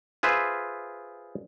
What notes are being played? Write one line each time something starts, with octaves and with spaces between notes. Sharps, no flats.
F4 G#4 B4 C5 E5